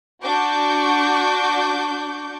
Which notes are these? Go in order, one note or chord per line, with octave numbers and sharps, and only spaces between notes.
D4 F#4 C#6 D6 G6